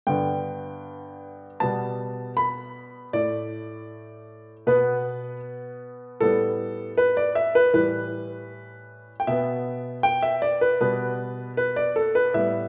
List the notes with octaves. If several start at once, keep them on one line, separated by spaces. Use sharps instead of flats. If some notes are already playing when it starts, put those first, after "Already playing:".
G2 D3 B3 G5
B2 G3 B3 A5
B5
A2 A3 D5
B2 B3 B4
A2 G3 B3 A4
B4
D5
E5
B4
A2 E3 G3 B4
G5
B2 B3 E5
G5
E5
D5
B4
B2 G3 B3 B4
B4
D5
A4
B4
A2 G3 B3 E5